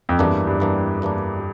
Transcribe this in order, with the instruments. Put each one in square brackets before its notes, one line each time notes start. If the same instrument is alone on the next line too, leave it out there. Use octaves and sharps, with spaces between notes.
[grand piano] F2
[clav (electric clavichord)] E2 E3 A#3 D4 [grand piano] G2
[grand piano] G2
[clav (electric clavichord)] E2 E3 A#3 D4
E2 E3 A#3 D4